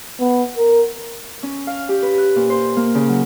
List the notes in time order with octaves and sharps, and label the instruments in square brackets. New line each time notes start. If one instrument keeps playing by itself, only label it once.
[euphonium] B3
A#4
[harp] C#4
F5
G4
B4
F#6
A#2
C5
A#3
C#3
F#3